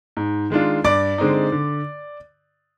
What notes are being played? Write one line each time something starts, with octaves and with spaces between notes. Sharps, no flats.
G#2
D#3 G#3 D4 F4
G2 D5 D6
D3 G#3 C4 D#4
D3